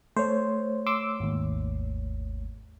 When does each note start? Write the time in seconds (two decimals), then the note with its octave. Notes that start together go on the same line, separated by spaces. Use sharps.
0.17 A3 C5 C#5
0.86 C6 D6 E6
1.20 G#1 D#2